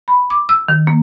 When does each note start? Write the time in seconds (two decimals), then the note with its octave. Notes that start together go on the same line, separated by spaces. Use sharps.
0.08 B5
0.30 D6
0.49 E6
0.68 D#3
0.87 A#3